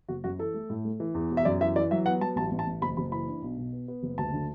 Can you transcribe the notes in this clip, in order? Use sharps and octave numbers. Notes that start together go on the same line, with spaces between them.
F#1 F#4
F#2 F#4
E3 A4
A3
A2
A3
E3
E2
E1
E5
F#2 D5
E3 E5
E3 D5
F#3 E5
B3 F#5
F#3 A5
A1 A5
A1
A5
A1
F#1 B5
F#1 B5
E3 B5
D4
B1
B2
B3
B3
F#1
D2 A5
D3